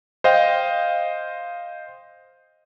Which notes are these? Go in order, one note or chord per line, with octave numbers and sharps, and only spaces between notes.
C5 D#5 F5 G5